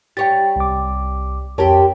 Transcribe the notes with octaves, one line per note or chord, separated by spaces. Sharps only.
G3 C#5 G5 A6
C2 D6
F2 C4 G4 A#4 C#5 A5